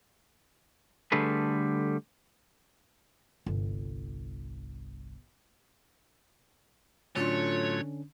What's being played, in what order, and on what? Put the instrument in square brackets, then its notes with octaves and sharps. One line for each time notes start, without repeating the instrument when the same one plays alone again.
[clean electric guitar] D3 G3 A3 G#4 B4
[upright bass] G1 C2
[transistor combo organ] A2 F#3 A3 [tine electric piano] D3 C#4 D4 [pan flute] F4 [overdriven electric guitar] C#5